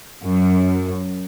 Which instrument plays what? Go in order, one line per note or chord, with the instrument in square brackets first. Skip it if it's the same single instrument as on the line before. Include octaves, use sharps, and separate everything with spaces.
[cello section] F#2